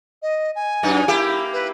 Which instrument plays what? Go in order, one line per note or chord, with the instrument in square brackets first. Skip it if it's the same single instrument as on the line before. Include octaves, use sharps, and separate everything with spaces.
[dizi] D#5
G#5
[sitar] F#2 F#3 D#4
A#3 E4 G4
[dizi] B4